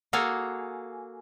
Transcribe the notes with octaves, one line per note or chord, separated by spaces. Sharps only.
A#3 F#4 G#4 A4 F5